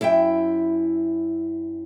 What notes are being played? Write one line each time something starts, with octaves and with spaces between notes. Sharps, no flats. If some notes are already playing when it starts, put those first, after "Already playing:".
F#2 E4 E5 G5